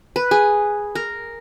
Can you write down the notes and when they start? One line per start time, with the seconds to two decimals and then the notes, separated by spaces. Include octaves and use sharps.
0.16 B4
0.31 G#4
0.95 A#4